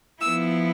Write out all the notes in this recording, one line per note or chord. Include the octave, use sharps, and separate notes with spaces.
F3 B3 E4 E6